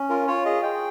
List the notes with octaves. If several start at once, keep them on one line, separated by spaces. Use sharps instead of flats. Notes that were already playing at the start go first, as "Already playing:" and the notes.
Already playing: C#4
F4 A#4
F4 C#5
G#4 D#5
G#4 G5